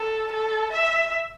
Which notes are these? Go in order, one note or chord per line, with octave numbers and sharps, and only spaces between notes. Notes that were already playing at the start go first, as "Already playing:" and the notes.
Already playing: A4
A4
E5